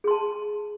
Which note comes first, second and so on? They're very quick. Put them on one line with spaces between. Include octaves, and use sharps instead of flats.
G#4 C6 A5